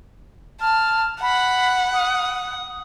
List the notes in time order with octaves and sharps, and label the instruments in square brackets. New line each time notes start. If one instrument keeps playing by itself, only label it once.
[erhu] A5 [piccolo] F6
[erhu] F#5 [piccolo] B5
[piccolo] D#6